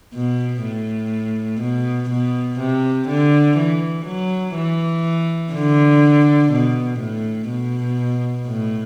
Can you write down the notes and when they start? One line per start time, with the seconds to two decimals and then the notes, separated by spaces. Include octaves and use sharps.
0.14 B2
0.63 A2
1.61 B2
2.10 B2
2.59 C3
3.08 D3
3.58 E3
4.06 F#3
4.55 E3
5.53 D3
6.52 B2
6.99 A2
7.49 B2
8.47 A2